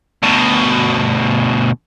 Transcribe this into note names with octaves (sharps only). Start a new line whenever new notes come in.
D2 B2